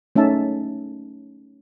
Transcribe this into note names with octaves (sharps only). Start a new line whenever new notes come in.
A3 C#4 D#4 E5 A5